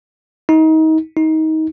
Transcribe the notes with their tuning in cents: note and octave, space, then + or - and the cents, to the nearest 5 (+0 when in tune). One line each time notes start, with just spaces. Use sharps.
D#4 +30
D#4 +25